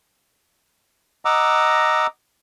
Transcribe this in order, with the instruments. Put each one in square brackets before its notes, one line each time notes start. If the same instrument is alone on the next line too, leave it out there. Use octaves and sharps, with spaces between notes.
[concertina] D#5 F#5 A#5 D6 E6